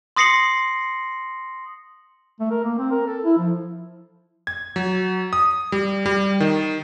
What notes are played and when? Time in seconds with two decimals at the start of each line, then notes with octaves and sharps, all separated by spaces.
0.16 C6 D#6 A#6 C7 C#7 F#7
2.40 A3
2.51 A#4
2.64 A#3
2.78 C4
2.91 A#4
3.07 A4
3.24 E4
3.38 F3
4.47 G#6
4.76 F#3
5.33 D#6
5.72 G3
6.06 G3
6.40 D#3